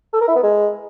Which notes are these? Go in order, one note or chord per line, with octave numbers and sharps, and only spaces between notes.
A4
A#4
E4
B3
G#3